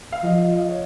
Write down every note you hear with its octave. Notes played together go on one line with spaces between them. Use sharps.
F5
F3 D#5
D#5
D#5
F5
C#5